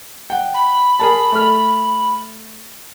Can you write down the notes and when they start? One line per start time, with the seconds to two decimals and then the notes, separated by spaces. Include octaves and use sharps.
0.30 F#5 G5
0.54 B5
0.99 G#4 A#4 A5
1.32 A3 F6